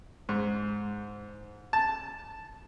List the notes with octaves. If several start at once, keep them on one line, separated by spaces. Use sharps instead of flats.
G#2
A5